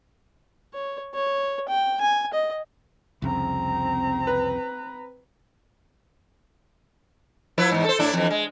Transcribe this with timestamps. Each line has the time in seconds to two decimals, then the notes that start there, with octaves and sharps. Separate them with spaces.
0.73 C#5
1.14 C#5
1.69 G5
2.01 G#5
2.33 D#5
3.22 C2 F2 C#3 C4 A#5
4.27 B4
7.58 F3 E4 B4
7.71 E2 G#2
7.84 A4 C5
7.99 A2 D4 E4
8.14 F2 E3
8.30 G#3